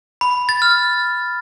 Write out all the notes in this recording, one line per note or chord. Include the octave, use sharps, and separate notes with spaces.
B5
A6
F6